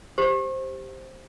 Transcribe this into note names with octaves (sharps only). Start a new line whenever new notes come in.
G4 C5